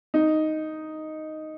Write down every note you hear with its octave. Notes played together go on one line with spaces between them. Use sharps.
D#4